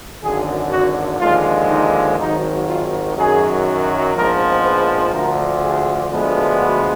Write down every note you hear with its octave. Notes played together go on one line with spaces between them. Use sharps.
G#1 F#2 D3 G#4
F#4
D#2 D3 F3 G#3 F4
D#4
G#1 G#2 D#3 F#3 D#4
F4
F#2 D#3 F#3 G#4
A#1 G#2 F3 G#3 B3 A#4
B4
D2 D3 F3 A#4
G#4
D2 D3 F3 G#3 B3
F#4